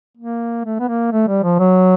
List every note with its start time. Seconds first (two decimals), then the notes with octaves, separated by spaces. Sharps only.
0.17 A#3
0.65 A3
0.80 B3
0.88 A#3
1.12 A3
1.28 G3
1.44 F3
1.60 F#3